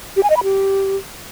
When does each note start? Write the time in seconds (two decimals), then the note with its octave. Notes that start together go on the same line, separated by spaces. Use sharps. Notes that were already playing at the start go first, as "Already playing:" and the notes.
0.16 G4
0.23 G#5
0.30 D#5
0.37 B5
0.43 G4